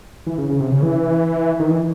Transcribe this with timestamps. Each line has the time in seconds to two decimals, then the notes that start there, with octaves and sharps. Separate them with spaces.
0.27 E3
0.38 C#3
0.49 C#3
0.60 C3
0.71 C#3
0.82 E3
1.60 D#3
1.71 E3